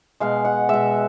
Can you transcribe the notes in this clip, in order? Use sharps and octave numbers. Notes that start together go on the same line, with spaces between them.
B2 G#3 F5
F#5
B2 G#3 E5